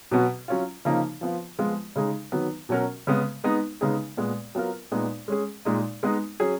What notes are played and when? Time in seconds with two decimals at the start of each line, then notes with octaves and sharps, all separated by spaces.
0.11 B2 F#3 B3 F#4
0.48 F#3 C#4 F4
0.85 C#3 F3 A#3 D#4
1.21 F3 B3 F4
1.59 F3 G#3 B3 F4
1.96 C#3 G#3 D#4 G#4
2.32 D#3 F#3 B3
2.69 B2 F#3 C#4 F#4 A#4
3.07 C#3 G#3 B3
3.44 G#3 B3 D#4
3.81 C#3 G#3 B3 D#4 G#4
4.17 A#2 G#3 B3
4.55 F#3 B3 F4 A#4
4.91 A#2 G#3 B3 D#4
5.28 G#3 C#4 G#4
5.65 A#2 G#3 D#4
6.03 G#3 B3 D#4
6.40 F#3 C#4 G#4